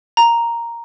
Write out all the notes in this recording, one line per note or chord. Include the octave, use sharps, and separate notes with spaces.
A#5